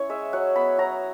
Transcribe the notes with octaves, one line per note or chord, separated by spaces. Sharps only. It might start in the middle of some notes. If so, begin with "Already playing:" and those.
Already playing: C#4 E4 C#5
G#3 E5
F#3 F#5
B3 B5
F#3 A#5